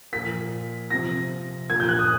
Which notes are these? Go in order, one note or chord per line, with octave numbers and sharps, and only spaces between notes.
A#2 F3 B6
C3 F3 A#6
A#2 F3 G#6
G6
F#6
D#6